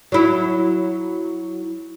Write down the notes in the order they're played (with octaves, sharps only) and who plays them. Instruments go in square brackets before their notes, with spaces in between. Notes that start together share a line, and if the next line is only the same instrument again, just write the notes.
[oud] F#3 E4